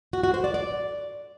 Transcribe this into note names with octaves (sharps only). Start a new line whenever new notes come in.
F#4
F#4
C5
D5
D5